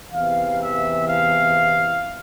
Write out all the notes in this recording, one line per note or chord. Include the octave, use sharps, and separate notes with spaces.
E2 C3 E3 F5
E5
F5